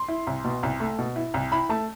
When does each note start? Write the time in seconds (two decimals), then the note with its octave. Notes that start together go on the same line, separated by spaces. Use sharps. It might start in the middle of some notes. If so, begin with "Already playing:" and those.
Already playing: C6
0.08 E4
0.27 C2
0.45 B2
0.63 C2
0.80 A3
0.99 B2
1.16 E4
1.34 C2
1.52 E4 B5
1.69 A3 A5